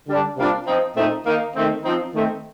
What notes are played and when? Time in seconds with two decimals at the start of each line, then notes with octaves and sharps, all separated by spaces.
0.08 D3 G3 D4
0.37 C3 G3 A#3 D4 F4
0.67 F3 C4 D#4
0.96 A#2 A3 C4 D#4
1.26 D#3 A#3 D#4
1.55 D#3 A3 C4
1.84 F3 C4 D#4
2.14 D#3 A3 C4